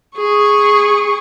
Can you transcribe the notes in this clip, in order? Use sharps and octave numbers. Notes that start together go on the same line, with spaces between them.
G#4 C#6